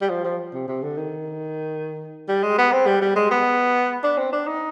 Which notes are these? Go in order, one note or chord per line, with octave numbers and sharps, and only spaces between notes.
G3
F3
F3
C3
C3
D3
D#3
G3
G#3
B3
C4
G3
G3
G#3
B3
D4
C4
D4
D#4